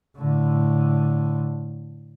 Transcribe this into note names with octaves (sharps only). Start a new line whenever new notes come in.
A2 D3